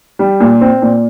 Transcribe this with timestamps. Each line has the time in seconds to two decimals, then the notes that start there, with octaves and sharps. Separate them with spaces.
0.19 G3
0.40 A#2
0.61 C4
0.82 A#2